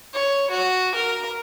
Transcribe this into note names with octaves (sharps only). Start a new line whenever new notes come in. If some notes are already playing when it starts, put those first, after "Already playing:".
C#5
F#4
A#4